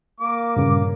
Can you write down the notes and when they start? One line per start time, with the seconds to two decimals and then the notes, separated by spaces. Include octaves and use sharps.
0.20 A#3 D6
0.57 G2 A#2 C#3